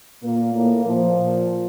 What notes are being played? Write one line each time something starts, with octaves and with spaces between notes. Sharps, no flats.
A#2 A#3
A2 A#3
A#2 F3
A#2